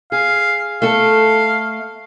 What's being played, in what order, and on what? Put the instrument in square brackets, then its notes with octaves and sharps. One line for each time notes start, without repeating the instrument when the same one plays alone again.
[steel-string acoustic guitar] G#4 [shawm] F5
[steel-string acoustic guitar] A3 A4 [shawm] F5